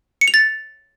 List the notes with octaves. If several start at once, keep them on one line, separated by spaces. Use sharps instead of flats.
C#7
F7
A6